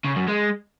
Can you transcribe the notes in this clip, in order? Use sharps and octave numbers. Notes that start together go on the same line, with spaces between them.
C#3
F#2
G#3